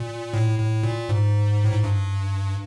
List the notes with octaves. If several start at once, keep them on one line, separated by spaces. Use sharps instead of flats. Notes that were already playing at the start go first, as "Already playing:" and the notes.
Already playing: A#2
A2
A2
A#2
G#2
A2
G#2
G2